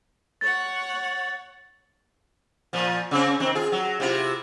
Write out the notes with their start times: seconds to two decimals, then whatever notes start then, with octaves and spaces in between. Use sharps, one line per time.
0.41 C#5 F#5 A6
2.73 A#2 F3
3.11 C#3 C4 C#4
3.40 D#3 C4
3.55 F4 G#4
3.72 F#3
4.00 C3 E4 F4